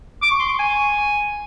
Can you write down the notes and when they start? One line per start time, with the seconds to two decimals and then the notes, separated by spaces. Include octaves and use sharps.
0.22 D6
0.31 C#6
0.40 C6
0.48 C#6
0.59 G#5